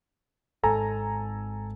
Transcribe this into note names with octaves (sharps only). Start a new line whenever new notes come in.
G#1 G#2 A4 G#5 A#5